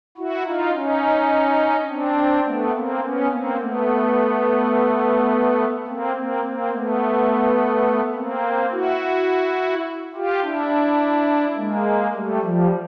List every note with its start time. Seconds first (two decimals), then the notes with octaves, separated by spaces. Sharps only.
0.18 E4 F#4
0.45 D#4 F4
0.74 C#4 D#4
1.89 C4 D4
2.46 A3 B3
2.74 A#3 C4
3.02 B3 C#4
3.31 A#3 C4
3.60 A3 B3
5.87 A#3 C4
6.16 A#3 C4
6.43 A#3 C4
6.72 A3 B3
8.15 A#3 C4
8.72 E4 F#4
10.14 F4 G4
10.42 D4 E4
11.56 G#3 A#3
12.14 G3 A3
12.42 F3 G3